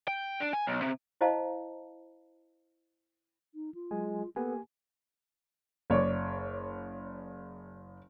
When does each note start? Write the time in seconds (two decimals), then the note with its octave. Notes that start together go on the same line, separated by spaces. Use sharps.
0.08 G5
0.40 D4
0.53 G#5
0.68 B1
0.82 C3
1.21 E4 C5 D#5 F5 A5 A#5
3.54 D#4
3.74 F4
3.91 F#3 G#3 G#5
4.36 A#3 B3 G4 A4 G#5
5.90 F#1 C#5 D5